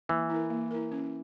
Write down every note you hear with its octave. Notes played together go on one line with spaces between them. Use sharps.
E3 A#3
E4 A#4
A#3
E4 A#4
C#4